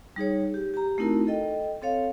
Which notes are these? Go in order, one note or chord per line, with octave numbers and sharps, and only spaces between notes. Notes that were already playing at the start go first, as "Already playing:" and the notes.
G3 D#4 G#4 C#5
G4
G4 A#5
A3 C4 D#4 E4 F#4 A#4
A4 D#5 G5
C4 A4 C#5 F5